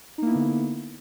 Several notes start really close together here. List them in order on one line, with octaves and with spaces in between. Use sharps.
D#4 A#3 E4 B3 D3